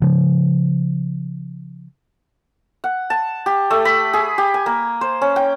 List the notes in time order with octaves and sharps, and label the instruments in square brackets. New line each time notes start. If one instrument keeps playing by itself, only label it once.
[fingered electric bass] C#3 F3
[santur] F#5
A5
G4
A3
B5
G#4
G4
G#5
A#3
C5
C#4
G5